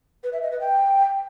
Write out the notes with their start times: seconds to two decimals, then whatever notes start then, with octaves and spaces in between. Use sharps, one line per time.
0.24 B4
0.33 E5
0.42 D#5
0.51 B4
0.61 G5